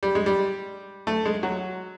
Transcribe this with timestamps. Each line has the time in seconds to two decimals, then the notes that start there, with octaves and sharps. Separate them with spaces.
0.03 G3
0.15 G#3
0.26 G3
1.07 A3
1.26 G#3
1.43 F#3